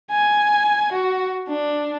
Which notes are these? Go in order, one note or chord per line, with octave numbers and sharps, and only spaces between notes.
G#5
F#4
D4